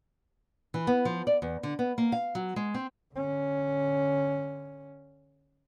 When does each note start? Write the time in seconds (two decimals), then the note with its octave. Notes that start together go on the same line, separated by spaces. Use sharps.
0.74 E3
0.87 B3
1.05 F3
1.27 D5
1.42 E2
1.63 D3
1.79 B3
1.98 A#3
2.12 F5
2.35 F#3
2.56 G#3
2.74 C4
3.14 D3 C#4